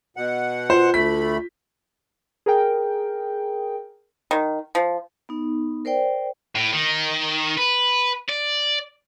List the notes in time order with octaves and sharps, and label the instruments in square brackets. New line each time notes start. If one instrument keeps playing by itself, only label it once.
[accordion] B2 F#5
[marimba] F4 [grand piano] C5
[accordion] D2 A3 B5 [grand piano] B6
[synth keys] G#4 A#4 G5
[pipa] D#3
F3
[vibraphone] B3 D#4
A#4 C5 D5 G5
[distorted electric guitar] A2
D#3
B4
D5